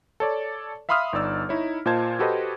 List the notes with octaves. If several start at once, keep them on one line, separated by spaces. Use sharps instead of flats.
A4 C#5 D5
E5 F5 B5 C6 D#6 F6
G1 D#4 D5 E6
D#4 E4 C#5
A#2 F4 C5 D#5 A5 G#6
F#4 G4 A4 B4 C5 D#5